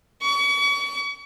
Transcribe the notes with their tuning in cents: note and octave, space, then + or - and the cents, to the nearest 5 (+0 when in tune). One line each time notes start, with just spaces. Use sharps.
C#6 +40